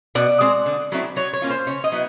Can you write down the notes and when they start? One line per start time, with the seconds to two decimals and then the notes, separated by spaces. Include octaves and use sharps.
0.15 B2 D5
0.41 G#3 C4
0.66 D3
0.92 F#3 A3 C4 E4
1.16 F#3 C#5
1.33 C#5
1.42 A#3 C#4 F4
1.50 C5
1.67 C#3 C#5
1.84 D#5
1.92 F#3 B3 E4